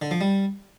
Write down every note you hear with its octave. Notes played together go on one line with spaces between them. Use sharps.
D3
F3
G3